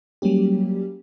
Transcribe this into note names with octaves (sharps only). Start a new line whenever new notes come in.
F#3 G3 A#3 C#4 G4